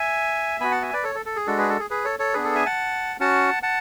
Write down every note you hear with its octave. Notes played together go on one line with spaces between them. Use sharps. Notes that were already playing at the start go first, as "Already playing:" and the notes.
Already playing: E5 G#5
B3 F#4 G#5 B5
F#5 A5
E5 G#5
B4 D5
A4 C#5
A4
A4
G#4
G#3 D4 F#4 A4
G#4 B4
A4
G#4
G#4 B4
A4 C#5
A4 C#5
B3 D4 G#4 B4
A4
E5 G#5
F#5 A5
C#4 F#4 F#5 A5
F#5 A5